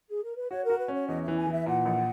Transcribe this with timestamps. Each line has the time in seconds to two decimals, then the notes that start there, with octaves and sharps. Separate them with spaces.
0.10 G#4
0.23 A#4
0.37 B4
0.50 F#4 C#5
0.65 F#4 A#4
0.79 B4
0.88 C#4
0.94 C#5
1.08 E2 D#5
1.22 E5
1.28 E3
1.37 G#5
1.47 E3
1.52 E5
1.66 A#2 F#5
1.86 A#1